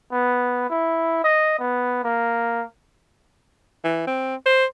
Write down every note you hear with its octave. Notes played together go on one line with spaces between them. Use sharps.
B3
E4
D#5
B3
A#3
E3
C4
C5